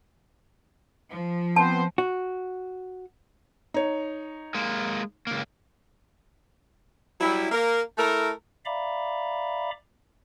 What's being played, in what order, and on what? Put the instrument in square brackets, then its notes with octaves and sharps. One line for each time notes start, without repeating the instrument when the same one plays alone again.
[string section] F3
[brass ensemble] B3 C4 C5 [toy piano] A5
[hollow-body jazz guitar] F#4
[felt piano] D#4 C#5
[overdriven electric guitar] G#3 A#3
C#2 A#3
[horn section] F#3 G3 E4
A#3 A#4
A3 E4 A4 A#4
[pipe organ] D5 E5 F5 A#5 B5 D6